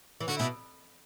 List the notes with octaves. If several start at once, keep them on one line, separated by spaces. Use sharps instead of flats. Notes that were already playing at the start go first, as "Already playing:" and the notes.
E3
D3 F#4
B2 E4